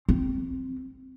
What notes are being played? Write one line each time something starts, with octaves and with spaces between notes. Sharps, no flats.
C4